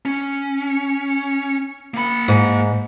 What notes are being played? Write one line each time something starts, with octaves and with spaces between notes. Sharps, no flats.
C#4
A#3 B5
G#2